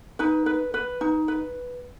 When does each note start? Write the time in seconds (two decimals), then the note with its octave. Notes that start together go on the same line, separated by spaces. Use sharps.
0.19 D#4 B4
0.46 B4
0.74 B4
1.01 D#4
1.28 B4